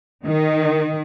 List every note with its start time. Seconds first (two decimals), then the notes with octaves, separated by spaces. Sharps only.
0.24 D#3